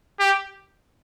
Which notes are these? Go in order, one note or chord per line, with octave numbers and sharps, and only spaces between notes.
G4